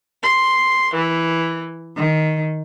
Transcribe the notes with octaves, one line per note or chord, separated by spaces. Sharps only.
C6
E3
D#3